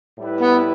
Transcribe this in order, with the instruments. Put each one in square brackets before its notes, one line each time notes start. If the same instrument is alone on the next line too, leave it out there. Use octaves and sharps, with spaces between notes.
[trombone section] A2 G3 E4 B4
[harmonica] B3